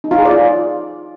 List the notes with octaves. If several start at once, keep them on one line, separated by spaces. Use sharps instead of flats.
D#4
F4
G#4
D5
F4